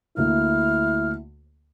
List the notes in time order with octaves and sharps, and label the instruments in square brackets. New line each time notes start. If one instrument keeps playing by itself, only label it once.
[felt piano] D2 A#3 [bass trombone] E4 [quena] F6